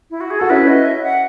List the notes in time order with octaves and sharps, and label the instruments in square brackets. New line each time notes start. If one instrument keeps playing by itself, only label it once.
[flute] E4
F#4
G#4
[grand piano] F#4 [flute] A4
[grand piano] C#4 E4 [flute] B4
[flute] D#5
E5
F#5